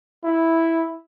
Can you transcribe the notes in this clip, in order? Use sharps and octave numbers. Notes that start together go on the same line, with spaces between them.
E4